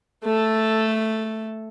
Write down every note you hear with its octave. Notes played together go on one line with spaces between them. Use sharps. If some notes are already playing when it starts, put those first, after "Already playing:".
A3 A4